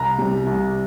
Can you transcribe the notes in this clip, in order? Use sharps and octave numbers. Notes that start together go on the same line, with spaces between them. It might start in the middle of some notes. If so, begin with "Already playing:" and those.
Already playing: C2 A#5
C3 G3
C2